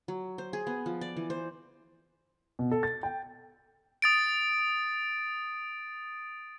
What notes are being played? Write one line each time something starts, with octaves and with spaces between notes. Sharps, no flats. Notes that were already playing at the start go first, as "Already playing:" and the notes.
F#3
C5
G#4
B3
F3
D5
E3
C5
B2
A4
A6
G5
D#6 A6 D7